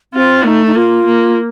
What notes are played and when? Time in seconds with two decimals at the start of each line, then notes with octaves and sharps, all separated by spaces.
0.13 C4 F4
0.44 A3 D#4
0.67 D#4
0.75 A#3 F4
1.06 A#3